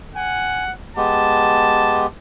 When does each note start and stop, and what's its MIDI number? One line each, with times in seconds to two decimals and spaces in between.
0.15 0.72 78
0.15 0.64 80
0.96 2.07 56
0.96 2.07 59
0.96 2.07 67
0.96 2.09 81